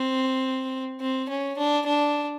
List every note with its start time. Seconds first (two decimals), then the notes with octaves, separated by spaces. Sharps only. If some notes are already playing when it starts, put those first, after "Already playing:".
Already playing: C4
1.01 C4
1.29 C#4
1.57 D4
1.87 D4